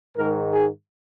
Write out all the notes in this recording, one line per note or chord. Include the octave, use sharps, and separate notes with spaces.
G#2 D#3 G#3 A#4
G#4